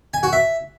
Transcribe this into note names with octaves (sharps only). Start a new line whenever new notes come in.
G#5
F#4
E5